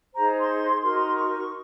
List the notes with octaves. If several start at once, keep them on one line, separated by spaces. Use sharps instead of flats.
D#4 G#4 C5 A#5
C6
D#4 F#4 A#4 C6
C#6